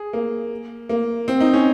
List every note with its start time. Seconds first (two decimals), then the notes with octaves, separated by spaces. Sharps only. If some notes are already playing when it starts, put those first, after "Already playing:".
Already playing: G#4
0.13 A#3
0.89 A#3
1.28 C4
1.40 D#4
1.53 C#4